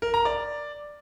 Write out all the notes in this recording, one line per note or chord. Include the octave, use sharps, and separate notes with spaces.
A#4
A#5
D5